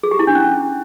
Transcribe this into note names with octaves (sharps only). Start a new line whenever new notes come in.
G#4
G4
E4
D4
C#4